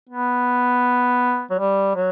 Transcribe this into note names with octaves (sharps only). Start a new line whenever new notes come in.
B3
F#3
G3
F#3